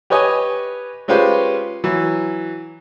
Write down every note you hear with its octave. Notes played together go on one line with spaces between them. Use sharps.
G4 B4 C#5 D#5 G#5
G#3 C#4 F4 G4 B4 C5
E3 F#3